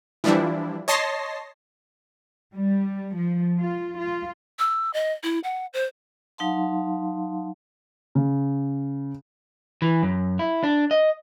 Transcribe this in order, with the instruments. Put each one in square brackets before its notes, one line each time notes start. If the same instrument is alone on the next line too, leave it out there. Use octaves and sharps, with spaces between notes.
[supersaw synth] E3 F3 G3 D4 E4
C#5 D#5 A5 C6 A#6 C7
[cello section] G3
F3
F4
F4
[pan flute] E6
D#5
E4
F#5
C5
[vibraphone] F#3 D#4 F5 F#5 A5 C6
[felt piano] C#3
[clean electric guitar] E3
F#2
E4
D4
D#5